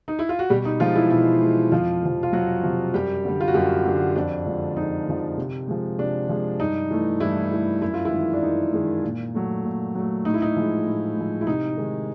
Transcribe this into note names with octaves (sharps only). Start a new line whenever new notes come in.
D#4
E4
F4
F#4
B2 G3 G4
D#4
F3 G#3 F4
E3 E4
B2 E3 E4
G#3
F2 F3 F4
C3 F3
F4
F2 F#3 F#4
C3 F3
F#2 G3 G4
D3 G3
F4
F#4
F#2 G3 G4
D3 G3
F2 D4
D3 F3 G#3
F2 D#4
D3 F3 G#3
C3
F3 G#3
C3 D4
F3 G#3
G2 D#4
E3 A3
G2 E3 E4
E3 A3
F#2 E4
F4
E3 E4
D#3 G#3
D4
F#2 D#4
D#3 G#3
A#2
F#3 A3
A#2
F#3 A3
A2 D#4
E4
D#4
F3 G#3
A2
F3 G#3
E4
C3 D#4
D#3 G#3